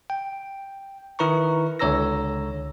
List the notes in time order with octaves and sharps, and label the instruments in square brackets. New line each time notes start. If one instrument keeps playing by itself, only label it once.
[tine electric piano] G5
D#3 E4 B4 A#5 C#6
C#2 D3 C#5 A#5 E6 A#6